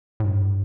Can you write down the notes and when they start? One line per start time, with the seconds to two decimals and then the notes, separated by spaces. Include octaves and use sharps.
0.20 A2
0.25 G2